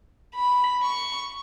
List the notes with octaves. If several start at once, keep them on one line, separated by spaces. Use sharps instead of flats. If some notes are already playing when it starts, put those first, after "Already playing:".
B5
C#6